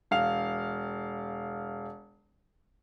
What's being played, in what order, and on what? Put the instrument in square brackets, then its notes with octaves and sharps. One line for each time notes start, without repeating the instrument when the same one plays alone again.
[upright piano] E1 F5 F7